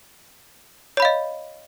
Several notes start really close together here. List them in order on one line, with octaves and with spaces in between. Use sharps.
C#5 B5 F5 D#5